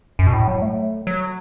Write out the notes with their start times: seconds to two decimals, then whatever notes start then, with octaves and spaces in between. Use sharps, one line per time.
0.19 F#2
0.27 B2
0.33 A2
0.48 F#3
0.62 A3
1.07 F#3